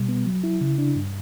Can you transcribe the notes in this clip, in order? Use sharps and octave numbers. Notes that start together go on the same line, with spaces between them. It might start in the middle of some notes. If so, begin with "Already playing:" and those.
Already playing: B2 G3
B3
F#3
E4
C#3
D4
G2